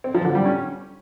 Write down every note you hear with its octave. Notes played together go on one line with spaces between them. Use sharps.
C4
F3
D3
G3
C#4